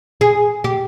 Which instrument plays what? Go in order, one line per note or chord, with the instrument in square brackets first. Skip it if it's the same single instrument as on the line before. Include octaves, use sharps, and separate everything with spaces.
[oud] G#4
G4